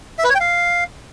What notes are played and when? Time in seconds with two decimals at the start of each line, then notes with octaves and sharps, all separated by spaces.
0.19 E5
0.24 B4
0.29 C#5
0.35 G5
0.40 F5